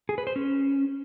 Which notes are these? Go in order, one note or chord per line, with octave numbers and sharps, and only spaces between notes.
G#4
B4
C5
C#4